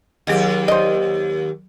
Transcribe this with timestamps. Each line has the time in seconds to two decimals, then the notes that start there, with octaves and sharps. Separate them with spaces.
0.27 D#2 F#3 G4 G#4 D#5
0.68 C5 D5 D#5